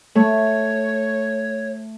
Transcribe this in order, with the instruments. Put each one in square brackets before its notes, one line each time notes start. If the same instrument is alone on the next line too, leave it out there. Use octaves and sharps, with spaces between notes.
[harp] A3 [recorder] C#5